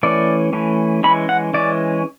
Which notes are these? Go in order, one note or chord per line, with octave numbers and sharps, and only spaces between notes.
E3 A3 C#4 D5
E3 A3 C#4
E3 G#3 C#4 B5
F#5
E3 G#3 C#4 D5